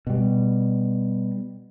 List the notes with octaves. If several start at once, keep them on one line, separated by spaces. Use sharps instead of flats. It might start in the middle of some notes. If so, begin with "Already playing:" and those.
B2 G3